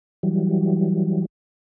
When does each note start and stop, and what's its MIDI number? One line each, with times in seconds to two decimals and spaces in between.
0.23 1.26 52
0.23 1.26 54
0.23 1.26 55